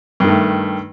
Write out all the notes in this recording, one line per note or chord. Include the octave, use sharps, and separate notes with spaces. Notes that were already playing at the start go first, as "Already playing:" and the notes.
G2 D#3 A3